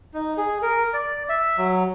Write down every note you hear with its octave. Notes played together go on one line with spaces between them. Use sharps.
D#4
G#4
A#4
D5
E5
F#3